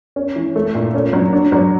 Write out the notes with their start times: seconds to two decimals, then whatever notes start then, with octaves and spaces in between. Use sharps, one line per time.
0.16 C#4
0.36 E3
0.56 A3
0.74 A#2
0.94 C#4
1.13 F#3
1.33 D4
1.52 F#3